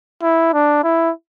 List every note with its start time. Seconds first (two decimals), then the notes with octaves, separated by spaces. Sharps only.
0.22 E4
0.53 D4
0.83 E4